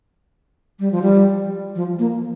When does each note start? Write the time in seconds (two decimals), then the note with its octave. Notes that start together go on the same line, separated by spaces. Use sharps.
0.80 G3
0.92 F3
1.02 G3
1.76 F3
1.99 A#3